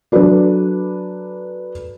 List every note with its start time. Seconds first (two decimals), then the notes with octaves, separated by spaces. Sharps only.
0.12 F#3 D4 A4 B4 D5